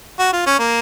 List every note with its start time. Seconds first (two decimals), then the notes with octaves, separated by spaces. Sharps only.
0.19 F#4
0.33 F4
0.46 C#4
0.59 A#3